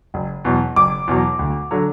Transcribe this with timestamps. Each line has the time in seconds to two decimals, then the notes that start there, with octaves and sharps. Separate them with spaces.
0.14 F#1
0.45 E2 B2 F#3
0.76 F#1 D6
1.08 E2 B2 F#3
1.39 D2
1.71 D3 F#3